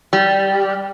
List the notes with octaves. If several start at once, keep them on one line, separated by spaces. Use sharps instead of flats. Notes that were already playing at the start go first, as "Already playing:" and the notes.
G3